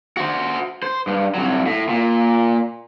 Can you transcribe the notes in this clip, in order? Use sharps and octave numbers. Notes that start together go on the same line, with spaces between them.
F#4 C5
C5
G2
C2 F#3
A2
A#2